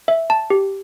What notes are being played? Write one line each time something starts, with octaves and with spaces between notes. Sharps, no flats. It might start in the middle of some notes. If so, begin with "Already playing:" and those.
E5
A5
G4